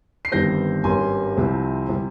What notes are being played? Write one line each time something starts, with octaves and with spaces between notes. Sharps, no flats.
C7
G1 G2 D#3 G3 C4 G6 A#6
G#1 G2 G3 C#4 G#5 C6
C2 C3 F3 C4
C3 G3